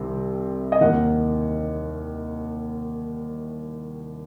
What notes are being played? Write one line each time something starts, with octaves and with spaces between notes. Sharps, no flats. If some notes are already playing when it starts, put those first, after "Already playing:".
Already playing: C2 C3 D#3
D#5
D#2 D#3 F#5